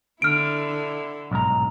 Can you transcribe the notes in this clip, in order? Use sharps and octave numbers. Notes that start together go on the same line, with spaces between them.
D3 E4 F6 D7
B1 G#2 A#5